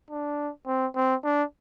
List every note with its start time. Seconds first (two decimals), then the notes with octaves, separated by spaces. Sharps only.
0.11 D4
0.67 C4
0.96 C4
1.24 D4